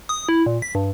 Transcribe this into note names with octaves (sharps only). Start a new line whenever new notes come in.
D#6
E4
A#2
B6
G2